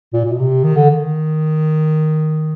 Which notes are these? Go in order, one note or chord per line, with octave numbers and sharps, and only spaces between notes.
A#2
A#2
B2
C3
D#3
D3
D#3